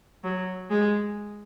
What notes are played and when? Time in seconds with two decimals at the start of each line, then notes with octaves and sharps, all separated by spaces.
0.24 F#3
0.70 G#3